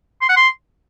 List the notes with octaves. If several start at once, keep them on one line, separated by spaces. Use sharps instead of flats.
C6
F#5
C6